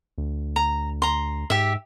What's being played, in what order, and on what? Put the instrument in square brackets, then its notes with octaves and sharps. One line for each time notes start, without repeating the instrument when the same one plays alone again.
[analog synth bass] D2
[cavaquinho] A#5
A#5 C6
[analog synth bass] G#2 [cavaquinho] G4 E5